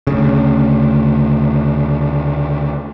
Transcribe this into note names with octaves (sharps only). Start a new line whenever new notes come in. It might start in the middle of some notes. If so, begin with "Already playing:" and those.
D2 C#3